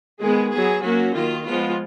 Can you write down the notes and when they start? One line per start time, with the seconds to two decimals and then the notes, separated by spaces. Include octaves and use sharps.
0.20 D#3 G#3 B3 G#4
0.52 F#3 B3 G#4
0.83 F#3 A#3 C#4 F#4
1.15 D#3 F#3 A#3 F4
1.46 F3 G#3 B3 F4